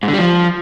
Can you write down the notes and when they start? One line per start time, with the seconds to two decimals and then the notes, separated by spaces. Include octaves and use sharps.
0.03 G#2
0.08 D3
0.13 G3
0.19 F3